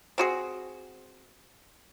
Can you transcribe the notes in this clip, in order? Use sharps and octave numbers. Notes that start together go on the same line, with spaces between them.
C4 F#4 G#4